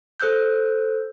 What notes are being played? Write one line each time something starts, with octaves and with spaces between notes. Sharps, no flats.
A4 C5 E6 F#6 G6